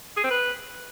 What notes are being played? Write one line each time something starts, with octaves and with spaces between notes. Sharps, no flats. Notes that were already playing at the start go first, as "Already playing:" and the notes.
G#4
C4
B4